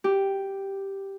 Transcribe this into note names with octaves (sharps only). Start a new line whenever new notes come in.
G4